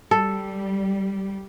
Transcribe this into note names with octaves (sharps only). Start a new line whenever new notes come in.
G3 A4